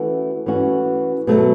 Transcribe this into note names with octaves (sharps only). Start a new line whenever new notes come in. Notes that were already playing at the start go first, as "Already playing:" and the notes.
Already playing: E3 A3 C#4 F#4
E3 A3 C#4 F#4
B2 F#3 A3